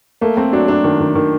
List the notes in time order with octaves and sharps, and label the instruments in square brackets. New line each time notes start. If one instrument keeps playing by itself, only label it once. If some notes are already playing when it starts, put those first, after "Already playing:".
[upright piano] A3 [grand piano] A#3
[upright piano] A3 [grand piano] C4
[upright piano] F#3 [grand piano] D4
[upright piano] F#3 [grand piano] D4
[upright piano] D#3
D#3
D#3